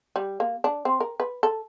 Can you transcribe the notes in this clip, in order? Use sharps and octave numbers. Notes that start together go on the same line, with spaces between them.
G3
A#3
D4
C4
A#4
B4
A4